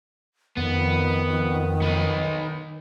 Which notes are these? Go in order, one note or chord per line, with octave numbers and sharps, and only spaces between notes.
F2 D#3 B3
B3 D#4